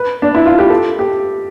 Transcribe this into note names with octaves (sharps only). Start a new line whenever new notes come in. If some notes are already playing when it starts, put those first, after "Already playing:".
Already playing: B4
D4
E4
F4
G4
A4
G4